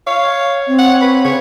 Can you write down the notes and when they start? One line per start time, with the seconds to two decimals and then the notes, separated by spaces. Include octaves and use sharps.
0.07 C#5 F5
0.67 C4
0.79 F#5
1.01 B4
1.25 C#3 C#5